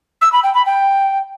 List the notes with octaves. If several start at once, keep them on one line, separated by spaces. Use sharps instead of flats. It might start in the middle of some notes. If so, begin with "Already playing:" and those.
E6
B5
G5
B5
G5